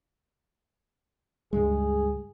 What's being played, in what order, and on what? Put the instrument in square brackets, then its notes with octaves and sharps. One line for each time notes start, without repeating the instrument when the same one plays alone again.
[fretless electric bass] C#2 G2 G#3 [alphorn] G#4